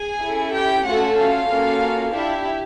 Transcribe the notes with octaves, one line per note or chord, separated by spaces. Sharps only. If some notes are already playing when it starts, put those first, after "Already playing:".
Already playing: G#4 G#5
C#4 E4 A4
G4 G5
A3 C#4 F4 F#4 A4 F#5
F4 F5
A#3 C#4 F#4 A4
D4 E4 G4 E5